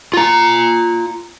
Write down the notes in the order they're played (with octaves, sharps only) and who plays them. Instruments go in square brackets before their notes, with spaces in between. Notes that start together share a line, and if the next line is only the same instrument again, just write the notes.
[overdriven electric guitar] F4 A#5